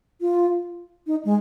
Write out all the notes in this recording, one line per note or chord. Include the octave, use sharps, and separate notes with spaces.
F4
D#4
G#3